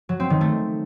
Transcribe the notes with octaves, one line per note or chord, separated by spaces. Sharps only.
F#3
C4
D#3
A3